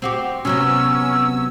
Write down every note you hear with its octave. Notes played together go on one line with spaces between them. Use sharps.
C4 F#4 G4
C3 F#3 B3 C#4 E6